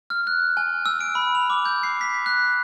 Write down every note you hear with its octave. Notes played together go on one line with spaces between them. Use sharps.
F6
F#6
G#5
E6
D7
B5
F7
D6
G6
C7
B6
F#6